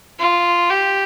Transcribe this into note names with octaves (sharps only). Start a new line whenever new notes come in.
F4
G4